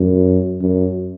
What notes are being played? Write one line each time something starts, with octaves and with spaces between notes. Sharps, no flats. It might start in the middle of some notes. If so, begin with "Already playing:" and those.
Already playing: F#2
F#2